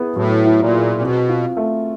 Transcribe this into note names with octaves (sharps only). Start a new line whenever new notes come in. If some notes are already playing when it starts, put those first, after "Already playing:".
Already playing: B3 E4 G#4
A2 F#3
E4
A#2
G#4
B2 C4
F4
A3